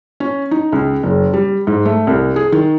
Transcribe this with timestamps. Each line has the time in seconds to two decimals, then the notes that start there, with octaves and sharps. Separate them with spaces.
0.20 C#4
0.51 D#4
0.72 C#2
1.03 F#1
1.33 G3
1.67 G#2
1.85 A3
2.07 C2
2.36 G#4
2.52 D#3